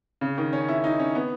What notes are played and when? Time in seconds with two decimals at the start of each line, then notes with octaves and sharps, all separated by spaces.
0.21 C#3
0.38 D#3
0.53 C#4
0.69 E4
0.84 D#4
0.99 C#4
1.15 B3